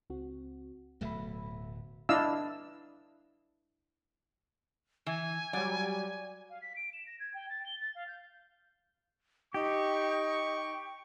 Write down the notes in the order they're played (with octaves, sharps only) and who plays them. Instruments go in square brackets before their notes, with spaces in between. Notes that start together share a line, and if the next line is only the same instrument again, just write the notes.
[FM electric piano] C#2 C4 F#4
[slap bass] D1 B2 F#3 [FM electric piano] A3 E5 B5
[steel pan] D4 E4 D#5 F5 E6
[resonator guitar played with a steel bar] E3 [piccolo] G#5
[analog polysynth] F#3 G3 [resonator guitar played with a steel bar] D5
[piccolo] F5
B6
D7
E7
A#6
G#6
G5
A6
G7
A6
F5
G6
[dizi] D#4 [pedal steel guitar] G4 [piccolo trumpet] C#6